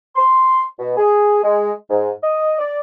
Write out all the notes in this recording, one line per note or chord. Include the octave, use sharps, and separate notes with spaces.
C6
B2
G#4
G#3
G#2
D#5
D5